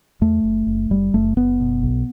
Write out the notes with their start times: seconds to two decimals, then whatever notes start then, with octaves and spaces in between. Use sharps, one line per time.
0.21 E2 A3
0.44 F#1
0.67 F#1
0.90 F#1 G3
1.14 F#1 A3
1.37 F#1 B3
1.60 B2
1.83 B1